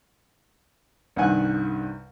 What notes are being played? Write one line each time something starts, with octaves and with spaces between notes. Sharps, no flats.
C2 G2 D#3 F#5 G#5